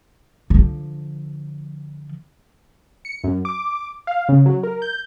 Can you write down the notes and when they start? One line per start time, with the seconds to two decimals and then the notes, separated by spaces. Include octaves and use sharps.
0.50 D3 F3
3.05 C#7
3.24 F#2
3.45 D6
4.07 F5
4.29 C#3
4.46 F#3
4.63 A#4
4.82 G6